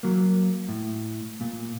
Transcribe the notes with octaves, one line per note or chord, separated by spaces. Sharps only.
F#3 A#3
A2
A#2